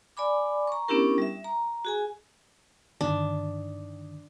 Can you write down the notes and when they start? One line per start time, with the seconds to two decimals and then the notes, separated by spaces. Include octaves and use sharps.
0.17 D5 G#5 B5 D6
0.67 A#5 C#6
0.88 B3 C#4 D4 E4 G4 A#4
1.18 G3 E5
1.44 A#5
1.85 F#4 G#4 G#5
3.01 G2 D3 D#3 D4